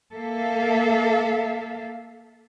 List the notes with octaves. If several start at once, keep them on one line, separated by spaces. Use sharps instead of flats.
A#3 A4 E5 F5